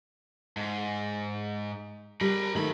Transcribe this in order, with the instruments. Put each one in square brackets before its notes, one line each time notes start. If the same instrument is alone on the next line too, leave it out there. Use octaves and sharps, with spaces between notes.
[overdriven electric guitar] G#2
[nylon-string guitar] G3 [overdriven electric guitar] A#4 B5
[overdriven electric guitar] F#2 B5 [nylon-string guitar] D#3 A3